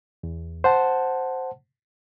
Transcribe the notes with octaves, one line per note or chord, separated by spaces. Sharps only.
E2
C5 F#5 A5